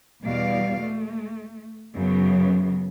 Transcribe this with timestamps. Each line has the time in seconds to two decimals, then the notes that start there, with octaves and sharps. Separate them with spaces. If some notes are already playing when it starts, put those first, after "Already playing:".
0.21 E2 B2 G3 D5 F5
0.80 A3
1.95 F#2 C#3 F#3 B3